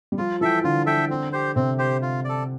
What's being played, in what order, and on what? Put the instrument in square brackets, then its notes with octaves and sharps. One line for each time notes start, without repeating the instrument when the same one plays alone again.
[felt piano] G3
[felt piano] F3 [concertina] F4
[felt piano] E3 [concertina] A4 E5 G5
[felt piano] D3 [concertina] F4
[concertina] A4 E5 G5
C4
G4 C5
[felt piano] C3 [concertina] C4
[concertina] G4 C5
F4
A4 D5